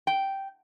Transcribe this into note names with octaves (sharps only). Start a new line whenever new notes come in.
G5